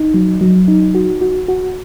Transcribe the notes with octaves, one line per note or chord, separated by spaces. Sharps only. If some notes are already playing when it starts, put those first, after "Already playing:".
Already playing: D#4
F#3
F#3
D#4
F#4
F#4
F#4